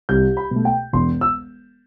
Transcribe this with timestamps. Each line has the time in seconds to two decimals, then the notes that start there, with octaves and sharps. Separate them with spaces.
0.09 C2 G6
0.37 B5
0.51 B2 A3
0.65 G5
0.93 E1 C6
1.21 E6